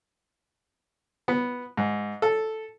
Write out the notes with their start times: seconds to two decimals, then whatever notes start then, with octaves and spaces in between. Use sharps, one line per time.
1.28 B3
1.77 G#2
2.22 A4